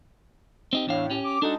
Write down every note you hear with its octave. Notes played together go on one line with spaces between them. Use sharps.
C4 D#4 G4
E2 A2 D4 F5
C#4 G4
D6
G#3 D4 D#4 F#4 A4